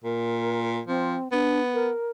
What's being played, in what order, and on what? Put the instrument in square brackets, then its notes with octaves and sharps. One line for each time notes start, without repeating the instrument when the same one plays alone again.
[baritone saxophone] A#2 [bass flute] A#4
[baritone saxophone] F3 [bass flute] C4
[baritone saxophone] B3 [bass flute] D4
[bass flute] A#4